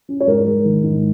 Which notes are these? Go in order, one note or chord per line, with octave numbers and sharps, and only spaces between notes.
C#4
C#5
G#2 A#4
G#3
D#3
G#2